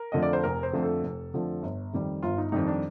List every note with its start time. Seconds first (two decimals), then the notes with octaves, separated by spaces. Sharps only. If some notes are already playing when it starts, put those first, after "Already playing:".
Already playing: A#4
0.12 F2 D3 F3 A3 D#5
0.22 D5
0.33 C5
0.44 F1 A#4
0.63 C5
0.73 F2 D3 F3 A3
0.83 A4
1.03 F1
1.34 F2 D3 F3 A3
1.62 G1
1.93 F2 D#3 G3
2.23 G1 F4
2.38 D#4
2.52 F2 D#3 G3 D#4
2.67 D4